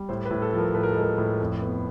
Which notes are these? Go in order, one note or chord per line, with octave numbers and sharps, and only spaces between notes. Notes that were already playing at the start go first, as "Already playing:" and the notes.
Already playing: G3
A2 C5
B4
A2
A4
F3
A#4
A2 B4
A#4
A4
G#3 A#4
A2
F2
B3